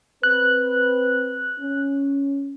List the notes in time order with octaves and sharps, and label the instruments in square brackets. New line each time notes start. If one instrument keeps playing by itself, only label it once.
[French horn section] C4 B4 [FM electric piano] F#6
[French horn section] C#4